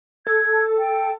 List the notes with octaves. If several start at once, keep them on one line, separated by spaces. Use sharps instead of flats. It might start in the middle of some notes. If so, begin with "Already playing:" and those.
A4 G#6
G5